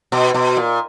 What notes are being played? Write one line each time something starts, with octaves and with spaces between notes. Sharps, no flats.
B2
B2
A#2